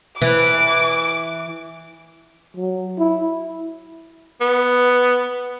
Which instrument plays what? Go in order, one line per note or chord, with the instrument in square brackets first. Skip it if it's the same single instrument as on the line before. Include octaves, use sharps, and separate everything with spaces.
[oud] E3 [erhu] D6
[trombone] F#3
E4
[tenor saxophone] B3